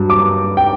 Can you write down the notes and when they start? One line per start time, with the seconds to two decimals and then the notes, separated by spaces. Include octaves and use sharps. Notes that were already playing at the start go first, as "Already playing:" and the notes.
Already playing: G2 F#3
0.10 D6
0.57 G5